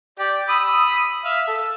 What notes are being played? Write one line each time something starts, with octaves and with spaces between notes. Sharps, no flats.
G4 D5
B5 D#6 E6
E5 F5
A4